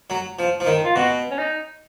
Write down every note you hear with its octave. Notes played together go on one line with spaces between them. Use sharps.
F#3
F3
F3
D#3
F4
B2 F#4
C#4
D#4